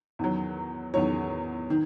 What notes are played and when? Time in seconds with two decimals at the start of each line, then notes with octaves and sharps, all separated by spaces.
0.19 E2 D#3 F#3
0.94 E2 D#3 F#3 C#5
1.70 D#3